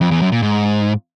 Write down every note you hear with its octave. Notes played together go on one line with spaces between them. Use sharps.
F2
E2
F#2
A#2
G#2